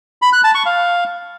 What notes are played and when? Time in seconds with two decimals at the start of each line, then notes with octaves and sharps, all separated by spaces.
0.22 B5
0.33 F#6
0.44 A5
0.55 C#6
0.66 F5